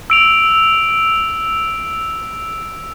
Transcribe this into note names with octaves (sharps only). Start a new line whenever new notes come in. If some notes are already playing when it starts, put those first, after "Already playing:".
E6 D7 F7